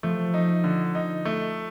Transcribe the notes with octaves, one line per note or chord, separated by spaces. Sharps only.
F3 A3
D#4
D3
D#4
A3